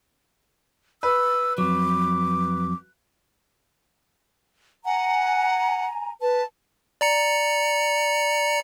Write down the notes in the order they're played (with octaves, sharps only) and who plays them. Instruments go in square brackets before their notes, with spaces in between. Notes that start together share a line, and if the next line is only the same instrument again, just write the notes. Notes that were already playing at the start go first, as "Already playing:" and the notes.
[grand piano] B4 [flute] E6
[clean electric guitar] F2 F#3 [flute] D6
[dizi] F#5 [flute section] G#5 A#5
[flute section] B4 [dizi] A5
[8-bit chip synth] D5 A#5 C#7